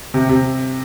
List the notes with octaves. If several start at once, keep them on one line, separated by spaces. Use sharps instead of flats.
C3
C3